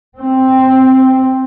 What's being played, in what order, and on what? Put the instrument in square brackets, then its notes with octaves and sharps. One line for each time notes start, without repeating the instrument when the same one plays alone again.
[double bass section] C4